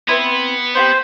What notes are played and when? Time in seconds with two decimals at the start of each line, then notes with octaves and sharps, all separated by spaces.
0.08 B3 C4 E4 B4
0.75 C4 F4 G4 C5